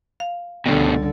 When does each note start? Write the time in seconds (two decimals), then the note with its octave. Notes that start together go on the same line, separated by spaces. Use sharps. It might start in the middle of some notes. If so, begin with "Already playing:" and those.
0.20 F5
0.66 C#2 G2 B2 D3 G3